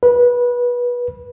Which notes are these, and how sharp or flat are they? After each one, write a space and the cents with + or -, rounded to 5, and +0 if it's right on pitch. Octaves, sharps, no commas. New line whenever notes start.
B4 -20